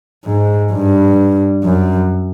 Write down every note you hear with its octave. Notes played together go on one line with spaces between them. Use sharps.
G#2
G2
F#2